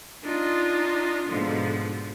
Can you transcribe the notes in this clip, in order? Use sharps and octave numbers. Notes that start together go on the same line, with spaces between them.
D4 D#4 F4
G#2 B2 D3 F3